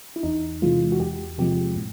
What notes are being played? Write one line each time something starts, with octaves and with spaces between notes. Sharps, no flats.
E4
E2 D#4
C3 E3 G#3 F4
F#4
E2 G4
C3 F3 G#3 G4
A2